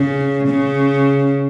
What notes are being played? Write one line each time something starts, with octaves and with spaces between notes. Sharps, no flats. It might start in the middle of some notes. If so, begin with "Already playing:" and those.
Already playing: C#3
C#3